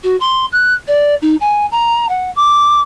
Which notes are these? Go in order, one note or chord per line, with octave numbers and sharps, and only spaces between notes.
F#4
C6
F#6
D5
D#4
G#5
A#5
F#5
D6